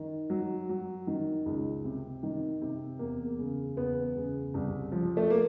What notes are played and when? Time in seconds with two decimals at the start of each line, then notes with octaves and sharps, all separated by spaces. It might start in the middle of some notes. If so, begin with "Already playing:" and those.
Already playing: D#3
0.30 F#3
0.69 F#3
1.07 D#3
1.46 C#2
1.84 C3
2.23 D#3
2.61 C3
2.99 E2 A#3
3.39 C#3
3.76 E2 B3
4.16 C#3
4.54 C2
4.92 F3
5.17 A3
5.30 A#3